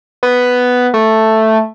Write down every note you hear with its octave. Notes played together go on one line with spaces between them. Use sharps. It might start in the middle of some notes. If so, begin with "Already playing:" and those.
B3
A3